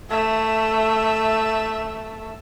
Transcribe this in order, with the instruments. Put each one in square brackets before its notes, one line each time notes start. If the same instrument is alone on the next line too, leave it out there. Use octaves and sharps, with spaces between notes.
[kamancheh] A3 E5